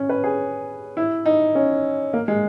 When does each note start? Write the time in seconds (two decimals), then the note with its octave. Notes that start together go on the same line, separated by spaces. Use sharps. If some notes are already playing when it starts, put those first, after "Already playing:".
Already playing: C#4
0.09 B4
0.24 G#4
0.97 E4
1.26 D#4
1.55 C#4
2.13 A#3
2.28 G#3